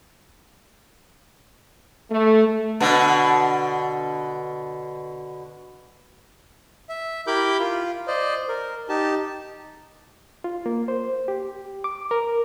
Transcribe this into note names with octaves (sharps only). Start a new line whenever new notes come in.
A3
B2 D3
E5
E4 G4 A#4 B5 D6 G6
F4
C5 D5 D#5
A#4
D#4 G4 A5
F4
A#3
C5
G4
D6
A#4